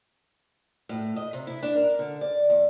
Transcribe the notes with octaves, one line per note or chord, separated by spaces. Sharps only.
A2
D#5
C3
E4
D4
A#4
D3
D5
E2